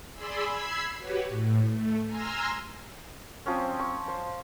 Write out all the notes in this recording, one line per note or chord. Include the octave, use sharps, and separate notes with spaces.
G#4 D5 G#5 B5 C6 E6
B5 E6 G#6 C7
F#4 G4 B4 C#5
A2
A3
G#5 A#5 C6 E6 F6
F3 C4 C#4
C#6
C5